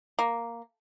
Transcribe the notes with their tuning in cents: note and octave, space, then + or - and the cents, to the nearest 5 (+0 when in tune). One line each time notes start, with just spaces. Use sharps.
A#3 +0